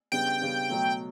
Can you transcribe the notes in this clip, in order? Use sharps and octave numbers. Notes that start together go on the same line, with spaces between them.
C#3 G3 B3 D4 G5
C#3 G3 B3 D4
B2 F#3 A3